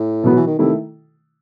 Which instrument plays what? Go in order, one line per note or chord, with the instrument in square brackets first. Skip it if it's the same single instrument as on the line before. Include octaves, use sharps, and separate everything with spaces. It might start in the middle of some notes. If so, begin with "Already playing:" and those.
Already playing: [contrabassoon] A2
[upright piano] B2 F#3 B3
[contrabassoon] E3
D#3
[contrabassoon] C3 [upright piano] D#3 A3 E4 A4